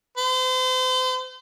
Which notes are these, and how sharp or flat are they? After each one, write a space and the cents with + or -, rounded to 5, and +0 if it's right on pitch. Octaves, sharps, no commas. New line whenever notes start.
C5 -35